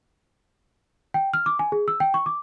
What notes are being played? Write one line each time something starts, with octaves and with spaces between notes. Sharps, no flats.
G5
F6
D6
G#5
G#4
E6
G5
C#6
D6